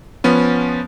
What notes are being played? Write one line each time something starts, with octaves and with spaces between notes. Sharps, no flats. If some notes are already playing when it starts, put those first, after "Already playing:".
F3 B3 C#4